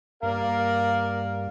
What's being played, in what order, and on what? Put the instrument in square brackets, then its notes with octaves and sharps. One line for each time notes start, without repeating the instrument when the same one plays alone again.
[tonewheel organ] G2 [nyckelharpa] A#3 D5 [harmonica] A#4 [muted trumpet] F5